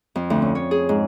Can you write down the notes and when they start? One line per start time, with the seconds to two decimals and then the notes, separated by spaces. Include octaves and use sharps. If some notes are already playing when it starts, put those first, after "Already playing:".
0.15 F2
0.30 D2
0.42 C#4
0.55 C#5
0.71 G#4
0.89 G#2